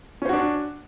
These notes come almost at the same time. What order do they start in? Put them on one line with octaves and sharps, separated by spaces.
C#4 C5 F#4 D4